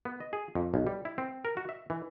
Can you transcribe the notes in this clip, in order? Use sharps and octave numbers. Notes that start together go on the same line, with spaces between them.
B3
D#5
G#4
F2
B1
G3
E4
C4
A#4
F#4
E5
E3